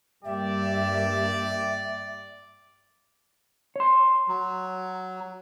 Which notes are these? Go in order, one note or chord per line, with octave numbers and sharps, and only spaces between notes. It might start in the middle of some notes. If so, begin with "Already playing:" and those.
G2 G3 A#3 G4 D5 E5
C#5 C6
F#3